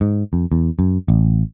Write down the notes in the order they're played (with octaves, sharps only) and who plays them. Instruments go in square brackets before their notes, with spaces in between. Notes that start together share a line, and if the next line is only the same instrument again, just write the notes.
[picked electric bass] G#2
F2
E2
F#2
A1